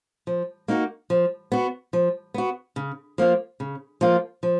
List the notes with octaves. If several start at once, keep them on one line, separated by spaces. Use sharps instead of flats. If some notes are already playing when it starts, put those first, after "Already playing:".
F3
A#3 D#4 F#4
F3
B3 F#4
F3
B3 F#4
C#3
F3 A#3 F4
C#3
F3 A#3 F4
F3